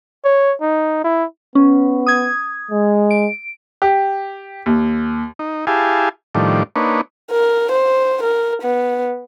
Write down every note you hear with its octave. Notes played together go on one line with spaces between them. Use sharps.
C#5
D#4
E4
B3 C#4
D#6 G#6
G#3
D7
G4
D#2
D#4
E4 G4 G#4 F5 G#5 A5
A2 D#3 F3 G3 D4
A#3 D4 D#4 B4 C#5
A#4
C5
A#4
B3